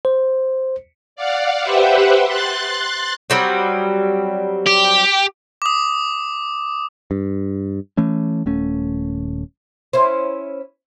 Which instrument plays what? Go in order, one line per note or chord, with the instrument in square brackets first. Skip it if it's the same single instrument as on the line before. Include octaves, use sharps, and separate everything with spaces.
[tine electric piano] C5
[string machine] D5 F5 F#5
G4 B4 C5 E5 F#5
C6 F#6 A6
[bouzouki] F#3 G3 C4
[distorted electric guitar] G4
[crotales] D6 D#6
[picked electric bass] G2
E3 A3 C#4
D#1 A3 C#4
[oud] C#4 E4 C5